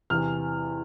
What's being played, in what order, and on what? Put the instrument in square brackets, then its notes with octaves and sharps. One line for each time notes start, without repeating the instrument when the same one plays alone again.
[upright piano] E2 C3 E3 F6